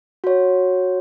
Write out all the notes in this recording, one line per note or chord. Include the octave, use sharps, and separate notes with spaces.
F#4 C#5